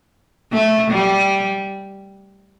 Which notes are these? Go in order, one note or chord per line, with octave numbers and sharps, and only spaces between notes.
A3
G3